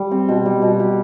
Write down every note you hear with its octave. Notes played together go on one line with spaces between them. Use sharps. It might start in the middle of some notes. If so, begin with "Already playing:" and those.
Already playing: G3
C4
B2
G3
B2
G4